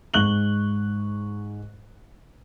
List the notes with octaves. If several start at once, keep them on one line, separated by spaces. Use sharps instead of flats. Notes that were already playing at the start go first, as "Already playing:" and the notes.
G#2 C#6 F#6 F#7 G7